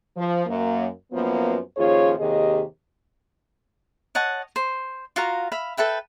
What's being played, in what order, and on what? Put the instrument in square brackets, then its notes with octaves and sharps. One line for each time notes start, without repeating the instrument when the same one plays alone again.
[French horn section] F3
F#2 A#3
F#2 F3 A#3 B3
D#2 F3 C#4 F4 G#4 C#5
D#2 C3 D#3 G4 G#4 D#5
[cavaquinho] C#5 D#5 F#5 A5
C5
F4 F#4 F5 A#5
E5 F5 B5
A4 B4 E5 G5